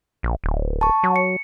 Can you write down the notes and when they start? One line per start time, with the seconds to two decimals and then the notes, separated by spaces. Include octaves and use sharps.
0.23 A#1
0.44 D1
0.81 A5 C#6
1.03 F#3
1.16 C#7